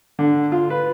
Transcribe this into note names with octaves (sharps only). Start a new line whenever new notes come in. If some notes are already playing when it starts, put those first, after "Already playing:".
D3
F4
B4